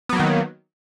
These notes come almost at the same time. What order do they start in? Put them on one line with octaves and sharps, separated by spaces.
B3 F#3 A#3 D#3